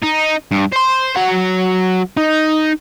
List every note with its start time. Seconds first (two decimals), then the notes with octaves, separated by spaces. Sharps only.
0.02 D#4
0.51 G2
0.72 C5 C6
1.16 F#3 F#5
2.17 D#4